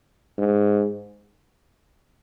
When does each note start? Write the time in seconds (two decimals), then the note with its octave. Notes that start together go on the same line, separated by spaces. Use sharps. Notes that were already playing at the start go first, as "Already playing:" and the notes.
0.38 G#2